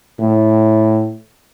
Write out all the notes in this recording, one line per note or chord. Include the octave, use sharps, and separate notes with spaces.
A2